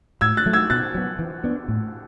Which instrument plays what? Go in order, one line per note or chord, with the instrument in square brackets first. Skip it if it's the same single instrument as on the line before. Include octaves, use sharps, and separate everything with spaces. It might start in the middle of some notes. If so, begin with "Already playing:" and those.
[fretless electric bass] A2 [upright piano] E6 G#6
[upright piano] F#6 A6
[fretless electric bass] F#3 A3
[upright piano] E6 G#6
[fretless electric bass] B2 [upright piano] F#6 A6
[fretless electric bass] F#3 B3
E3
B3 D4
A2